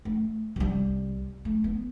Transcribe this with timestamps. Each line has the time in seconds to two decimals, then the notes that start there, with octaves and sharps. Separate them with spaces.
0.05 A3
0.56 C2 G3
1.45 A3
1.64 B3